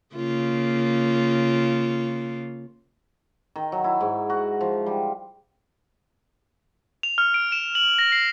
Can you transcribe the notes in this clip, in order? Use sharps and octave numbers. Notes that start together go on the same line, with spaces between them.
C#3 A#3 F4
D#3
F#3
E4
G#2
F#4
F3
G3
F7
F6
D7
E7
F#7
A#6
C7